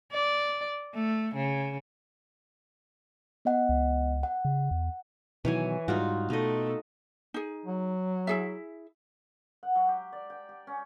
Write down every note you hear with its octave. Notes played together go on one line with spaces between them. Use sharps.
D5
A3
C#3
B3 D#5 F#5
C#2
F#5
C#3
E2
B2 D#3 E3 F#3 C#5 G#5
G#2 G3 D#4 F4 F#4
B2 A3 D#4 A4 D#5
D#4 G#4
F#3
E4 G#4 E5
F#5
F#3
G4
D5
G5
G4
C#4